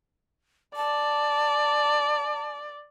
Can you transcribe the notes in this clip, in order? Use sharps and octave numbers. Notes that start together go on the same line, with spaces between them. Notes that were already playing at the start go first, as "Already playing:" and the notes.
D5 A5